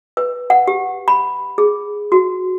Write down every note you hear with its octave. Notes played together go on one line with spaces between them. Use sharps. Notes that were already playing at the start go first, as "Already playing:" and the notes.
B4
F#5
G4
B5
G#4
F#4